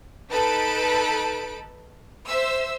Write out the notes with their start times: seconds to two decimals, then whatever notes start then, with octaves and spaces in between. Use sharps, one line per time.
0.31 D#4 A4 B4 A5 B5 D7
2.27 C5 E5 E6